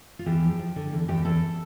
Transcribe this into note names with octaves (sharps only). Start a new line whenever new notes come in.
F4
E2 G4
F3
F3
D3
E2
E2 G4
E2 A4